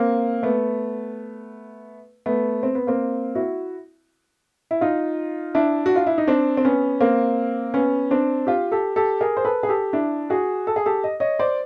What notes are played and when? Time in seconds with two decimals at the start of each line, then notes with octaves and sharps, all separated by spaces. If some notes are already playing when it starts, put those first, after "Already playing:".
Already playing: A#3 C4
0.43 A3 B3
2.26 A3 B3
2.63 C4
2.75 B3
2.87 A#3 C4
3.35 E4 F#4
4.71 E4
4.81 D#4 F4
5.55 D4 E4
5.86 F#4
5.96 F4
6.07 E4
6.18 D#4
6.27 C4 D4
6.57 C4
6.65 B3 C#4
7.00 A#3 C4
7.74 B3 C#4
8.11 C4 D4
8.47 F4 G4
8.72 G4 A4
8.96 G4 A4
9.21 G#4 A#4
9.37 C5
9.45 A4 B4
9.63 G#4
9.69 G4 A4
9.93 D4 E4
10.30 F#4 G#4
10.67 A4
10.76 G#4
10.86 G4 A4
11.04 D#5
11.20 C#5 D#5
11.39 C5 D5